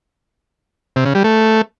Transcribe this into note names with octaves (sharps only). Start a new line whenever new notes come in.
C3
C#3
G3
A3